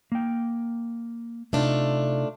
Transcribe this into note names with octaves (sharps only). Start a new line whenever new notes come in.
A#3 G5
C3 A3 D4 D#4 F4